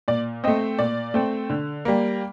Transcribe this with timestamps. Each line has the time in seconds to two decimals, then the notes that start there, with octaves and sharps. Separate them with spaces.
0.08 A#2 D5
0.44 A3 C4 D#5
0.79 A#2 D5
1.14 A3 C4
1.50 D3
1.85 G3 A#3